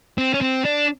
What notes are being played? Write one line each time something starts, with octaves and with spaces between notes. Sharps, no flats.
C4
C#4
C4
D4